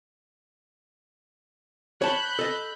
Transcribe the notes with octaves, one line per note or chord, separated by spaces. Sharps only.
C#5 A5 B5 F#6 G6
A4 D#5